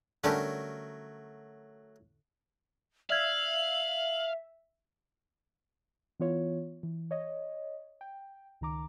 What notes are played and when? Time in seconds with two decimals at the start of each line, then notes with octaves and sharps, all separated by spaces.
0.24 D3 F#3 G3 A3 C#4 A#4
3.10 D5 E5 F5 F6 G#6 F#7
6.20 E3 B3 F4 C#5
6.83 E3
7.11 C#5 D#5
8.01 G5
8.61 C#2 D#3 A#5 D6